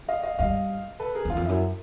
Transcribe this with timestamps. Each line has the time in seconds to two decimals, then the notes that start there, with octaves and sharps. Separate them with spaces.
0.08 D#5 F5
0.23 D#5 F5
0.39 G2 D#5 F5
1.00 A4 B4
1.15 G#4 A#4
1.25 E2 F4
1.36 F2
1.46 F#2 E4